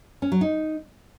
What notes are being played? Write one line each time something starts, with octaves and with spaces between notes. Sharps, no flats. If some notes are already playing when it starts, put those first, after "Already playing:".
C#4
F#3
D#4